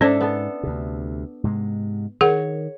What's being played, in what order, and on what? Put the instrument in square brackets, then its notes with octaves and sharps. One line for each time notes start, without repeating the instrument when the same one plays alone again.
[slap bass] G#2 [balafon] C#4 C5 [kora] D4 A4 E5
[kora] B3 A4
[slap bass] D2 C3
G#2 C3 G#3
[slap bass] D#3 [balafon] G#4 A#4 F#5 [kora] C#5